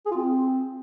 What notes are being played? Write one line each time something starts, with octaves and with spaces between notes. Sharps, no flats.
G#4
F4
C4